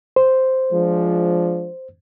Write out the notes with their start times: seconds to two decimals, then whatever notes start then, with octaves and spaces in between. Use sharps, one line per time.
0.16 C5
0.72 F3 G#3 D4